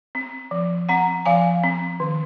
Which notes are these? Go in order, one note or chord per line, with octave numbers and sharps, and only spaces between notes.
C4
F3
C4 F#5 A#5
F3 F5 G#5
C4
D#3